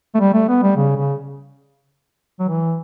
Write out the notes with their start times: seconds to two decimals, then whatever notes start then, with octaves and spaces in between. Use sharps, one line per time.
0.15 A3
0.20 G3
0.33 A3
0.49 B3
0.63 G3
0.77 C#3
0.96 C#3
2.40 F#3
2.48 E3